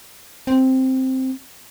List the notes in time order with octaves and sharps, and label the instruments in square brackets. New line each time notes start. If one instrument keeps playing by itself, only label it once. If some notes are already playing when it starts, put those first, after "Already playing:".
[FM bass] C4